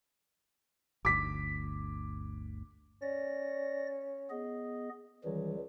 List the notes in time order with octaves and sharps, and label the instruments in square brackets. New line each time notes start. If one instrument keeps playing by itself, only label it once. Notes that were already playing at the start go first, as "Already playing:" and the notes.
[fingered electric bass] G1 D2 [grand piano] D6 B6
[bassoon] C#4 [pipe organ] D5 A#6
[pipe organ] B3 G#4 D#5
[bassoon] C#2 [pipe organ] D#3 E3 G3